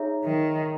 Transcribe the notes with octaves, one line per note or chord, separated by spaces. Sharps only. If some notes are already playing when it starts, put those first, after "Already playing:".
Already playing: D#4 G#4 C#5 E5 A#5
D#3